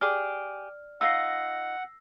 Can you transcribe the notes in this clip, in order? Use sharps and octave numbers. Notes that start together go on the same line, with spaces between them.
G4 G#4 D5 D6 F6
D#4 F4 D#5 F#5 E6 A#6 C7